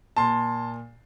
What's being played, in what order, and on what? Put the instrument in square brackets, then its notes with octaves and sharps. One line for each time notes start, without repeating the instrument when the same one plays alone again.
[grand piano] A#2 A5 C6